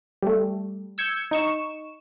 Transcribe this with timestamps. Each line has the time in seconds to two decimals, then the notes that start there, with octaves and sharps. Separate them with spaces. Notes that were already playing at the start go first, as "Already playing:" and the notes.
0.23 G3 A3
0.98 E6 G6 G#6 C#7
1.31 D#4 C#6 E7